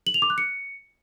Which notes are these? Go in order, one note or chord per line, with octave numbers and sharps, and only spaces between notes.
F#7
F7
D6
F#6
C#7